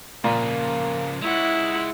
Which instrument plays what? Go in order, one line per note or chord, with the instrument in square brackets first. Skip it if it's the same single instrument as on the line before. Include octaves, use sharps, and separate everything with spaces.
[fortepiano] A#2 [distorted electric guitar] C#3 F3 [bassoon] A#3
[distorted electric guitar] G#3 C#5 [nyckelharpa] E4 F#5